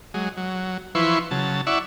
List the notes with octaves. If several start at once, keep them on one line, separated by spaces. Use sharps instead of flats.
F#3 G#3
F#3
E3 F3 E4 B4 C6 C#6
C#3 F#3 A5
E4 D5 E5 F#5 C#6